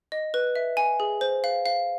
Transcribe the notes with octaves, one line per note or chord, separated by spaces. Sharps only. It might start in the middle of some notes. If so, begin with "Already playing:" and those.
D#5
B4
E5
G#5
G#4
C5
F5
F5